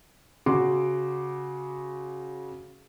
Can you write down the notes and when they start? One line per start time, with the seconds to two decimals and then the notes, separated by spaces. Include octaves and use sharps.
0.46 C#3 F#4 C6 D6